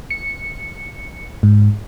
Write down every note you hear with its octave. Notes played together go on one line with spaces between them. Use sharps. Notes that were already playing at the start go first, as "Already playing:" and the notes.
C#7
G#2